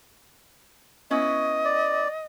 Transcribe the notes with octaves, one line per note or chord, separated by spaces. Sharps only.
B3 C#4 E4 D#5
D5